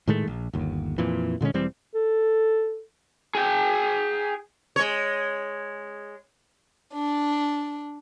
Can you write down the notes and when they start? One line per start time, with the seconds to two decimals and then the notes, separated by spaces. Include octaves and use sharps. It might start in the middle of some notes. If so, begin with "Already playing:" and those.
0.07 A2 D#3 G#3 A3
0.27 A#1
0.53 G1 D#2
0.98 F2 A#2 E3
1.41 A#2 D3 G#3 C#4
1.54 E1 E3 G3 C4
1.95 A4
3.35 G#4 G5
4.76 G#3 C#5
6.93 D4